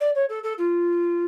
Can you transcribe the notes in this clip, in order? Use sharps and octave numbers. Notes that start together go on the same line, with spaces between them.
D5
C#5
A4
A4
F4